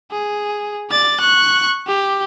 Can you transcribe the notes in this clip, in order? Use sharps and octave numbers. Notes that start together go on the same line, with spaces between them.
G#4
D5 A6
C#6 F#6
G4